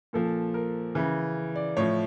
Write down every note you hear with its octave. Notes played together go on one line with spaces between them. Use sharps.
A#2 F3 A4
A#4
C#3 E3
D5
A2 F3 C#5